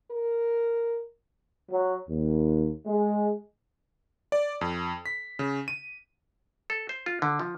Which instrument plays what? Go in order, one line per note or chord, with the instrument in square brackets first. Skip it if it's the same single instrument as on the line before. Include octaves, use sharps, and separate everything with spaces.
[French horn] A#4
[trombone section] F#3
D#2
G#3
[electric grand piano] D5
F2
B6
C#3
D#7
[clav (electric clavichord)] A4
C5
F4
D3
F3